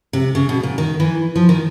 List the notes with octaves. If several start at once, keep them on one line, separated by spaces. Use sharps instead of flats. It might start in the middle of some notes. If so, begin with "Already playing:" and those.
C3
C#3
B2
A#2
D#3
E3
F3
D#3